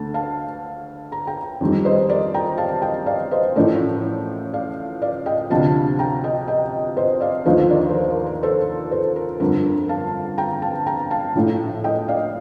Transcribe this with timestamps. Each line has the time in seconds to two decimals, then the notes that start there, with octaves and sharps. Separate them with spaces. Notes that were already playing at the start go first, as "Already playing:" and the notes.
Already playing: D2 D3 A3 A5
0.14 F5 A5
1.12 A#5
1.27 G5 A#5
1.61 F2 D#3 G3
1.85 C5 D#5
2.09 A#4 D5
2.34 G5 A#5
2.58 F5 A5
2.82 D#5 G5
3.06 D5 F5
3.31 C5 D#5
3.56 A1 A2 F3 A3 A#4 D5
4.53 D5 F5
5.02 D5 F5
5.26 D#5 G5
5.50 D2 C3 F3 F5 A5
5.99 G5 A#5
6.24 D#5 G5
6.48 D#5 G5
6.97 C5 D#5
7.21 D5 F5
7.45 D#2 D3 F3 A3 C5 D#5
7.69 A#4 D5
7.89 C5
7.94 A#4
8.10 A#4
8.26 A#4
8.43 A4 C5
8.91 A4 C5
9.16 A#4
9.40 G1 F2 D3 A#4
9.65 A#4
9.89 F5 A5
10.38 G5 A#5
10.62 F5 A5
10.86 G5 A#5
11.11 F5 A5
11.35 A#1 A2 A3
11.84 D#5 G5
12.08 D5 F5